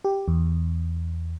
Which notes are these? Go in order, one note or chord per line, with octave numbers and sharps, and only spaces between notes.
G4
E2